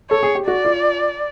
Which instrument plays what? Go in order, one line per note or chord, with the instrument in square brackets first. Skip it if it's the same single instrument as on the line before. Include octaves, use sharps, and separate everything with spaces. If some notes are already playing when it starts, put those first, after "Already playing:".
[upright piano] A4 [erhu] C#5
[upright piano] G#4
G4
[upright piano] F#4 [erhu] D5
[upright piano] F4